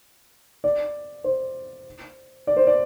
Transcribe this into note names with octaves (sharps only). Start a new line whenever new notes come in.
D5
C5
D5
C5
D5